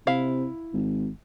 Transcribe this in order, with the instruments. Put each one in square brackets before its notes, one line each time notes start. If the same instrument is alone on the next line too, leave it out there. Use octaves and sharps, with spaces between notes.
[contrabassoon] C3 [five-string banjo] E4 F5
[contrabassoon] G#1